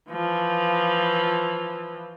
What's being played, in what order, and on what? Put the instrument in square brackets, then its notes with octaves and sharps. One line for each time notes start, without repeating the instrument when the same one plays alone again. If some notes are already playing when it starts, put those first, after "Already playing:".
[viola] E3 F3